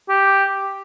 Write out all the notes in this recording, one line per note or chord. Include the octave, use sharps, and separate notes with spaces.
G4